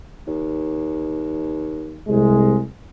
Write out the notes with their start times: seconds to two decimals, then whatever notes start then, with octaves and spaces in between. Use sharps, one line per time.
0.27 D#2
2.07 C2 C3 G#3